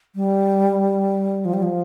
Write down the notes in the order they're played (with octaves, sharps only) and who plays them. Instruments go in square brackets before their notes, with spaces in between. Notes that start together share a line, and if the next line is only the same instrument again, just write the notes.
[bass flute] G3
F3
G3
F3